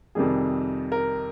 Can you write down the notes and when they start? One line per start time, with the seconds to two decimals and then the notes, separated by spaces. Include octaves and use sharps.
0.15 F2 C3 D#3 G3 G#4
0.92 A#4